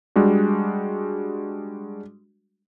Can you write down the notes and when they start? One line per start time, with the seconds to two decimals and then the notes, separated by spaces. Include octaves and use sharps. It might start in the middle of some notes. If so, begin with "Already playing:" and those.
0.16 G3 G#3 D4 F#4